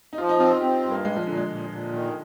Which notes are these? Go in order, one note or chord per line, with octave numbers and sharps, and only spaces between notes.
D#4
F3 F4
D#4
C4 F4
F4
C4 G4
G2
A#3
A#2 G#3
F3
A#2 D3
G#3
A#2
A#2
D#3